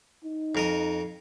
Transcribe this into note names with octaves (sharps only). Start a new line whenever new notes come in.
D#4
F2 A#4 D#6